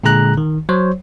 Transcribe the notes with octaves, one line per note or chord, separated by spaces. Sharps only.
A#2 D3 G#3 G#4 A#5 F#6
D#3
F#3 C5 C#5